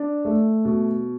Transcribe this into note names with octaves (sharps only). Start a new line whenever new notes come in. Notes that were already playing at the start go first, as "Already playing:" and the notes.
Already playing: D4
A3
B2